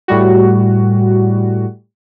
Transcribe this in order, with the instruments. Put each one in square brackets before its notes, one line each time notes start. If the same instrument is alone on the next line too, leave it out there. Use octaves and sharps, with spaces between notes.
[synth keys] A2 G3 F#4